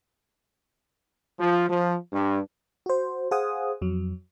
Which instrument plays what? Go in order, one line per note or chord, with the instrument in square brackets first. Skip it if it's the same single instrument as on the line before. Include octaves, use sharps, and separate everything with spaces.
[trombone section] F3
F3
G2
[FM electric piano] F#4 C5
G#4 C5 F5 F#5 G#5 D#6
F2 F#3